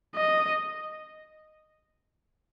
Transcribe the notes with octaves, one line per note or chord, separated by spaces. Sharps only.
D#5